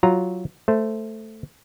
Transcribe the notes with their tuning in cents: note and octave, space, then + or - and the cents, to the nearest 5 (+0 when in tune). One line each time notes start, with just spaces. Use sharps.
F#3 +0 F4 +0 A#5 +0
A3 +0 C5 +0